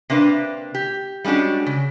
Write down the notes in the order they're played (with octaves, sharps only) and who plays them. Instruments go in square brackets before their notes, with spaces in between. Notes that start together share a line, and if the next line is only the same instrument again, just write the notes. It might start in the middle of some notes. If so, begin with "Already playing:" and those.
[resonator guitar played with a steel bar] C3 A#3 D4 B4
G4
G3 G#3 C#4 D4 F#4
C#3